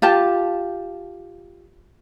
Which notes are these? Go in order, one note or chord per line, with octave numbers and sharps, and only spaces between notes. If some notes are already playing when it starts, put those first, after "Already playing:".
F4 G4 A5